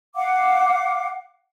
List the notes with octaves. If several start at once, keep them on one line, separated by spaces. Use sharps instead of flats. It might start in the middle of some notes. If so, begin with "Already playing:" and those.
F5 F#5 D6